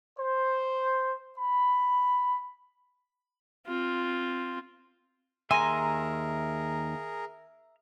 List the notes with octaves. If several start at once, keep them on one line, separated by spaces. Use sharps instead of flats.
C5
B5
C4 F4
D#2 G#4 A#4 E5 G#5 A#5 C6